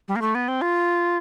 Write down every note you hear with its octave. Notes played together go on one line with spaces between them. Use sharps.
G3
A#3
A3
B3
C4
F4